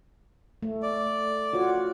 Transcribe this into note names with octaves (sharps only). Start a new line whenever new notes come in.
A3
D5
F4 F#4 C#5